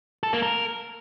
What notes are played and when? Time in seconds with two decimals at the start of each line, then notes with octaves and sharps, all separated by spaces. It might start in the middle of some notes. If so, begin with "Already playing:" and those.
0.23 A4
0.33 A#3
0.42 A#4